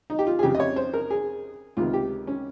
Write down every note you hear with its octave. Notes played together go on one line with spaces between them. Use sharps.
D#4
G4
F4
G#4
F2 C#3 G4
D#5
C#5
C5
A#4
G#4
C#2 C3 D#3 F4
G4
C#4